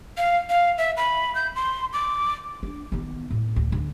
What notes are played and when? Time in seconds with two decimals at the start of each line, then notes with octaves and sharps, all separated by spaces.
0.17 F5
0.50 F5
0.78 E5
0.97 B5
1.35 G6
1.56 C6
1.93 D6
2.63 D4
2.92 D#3 B3
3.30 A2
3.56 D2
3.72 D3